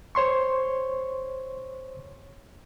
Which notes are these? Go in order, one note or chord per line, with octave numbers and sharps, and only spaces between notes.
C5 C#5 C6 C#6